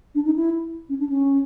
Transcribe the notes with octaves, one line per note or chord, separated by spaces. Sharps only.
D4
D#4
E4
C#4
D4
C#4